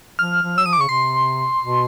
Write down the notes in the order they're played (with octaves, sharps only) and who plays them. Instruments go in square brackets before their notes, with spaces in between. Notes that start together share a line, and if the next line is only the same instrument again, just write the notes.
[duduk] F3 [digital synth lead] F6
[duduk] F3
[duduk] F#3 [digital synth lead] E6
[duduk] F3 [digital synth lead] D#6
[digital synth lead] D6
[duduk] C#3 [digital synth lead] C#6
[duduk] C3 [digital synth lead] C6
[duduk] B2